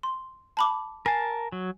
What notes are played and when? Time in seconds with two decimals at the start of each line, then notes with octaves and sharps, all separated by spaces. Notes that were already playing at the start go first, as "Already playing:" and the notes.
0.03 C6
0.57 A5 B5 D6
1.06 A#4 G#5 A5 C7
1.52 F#3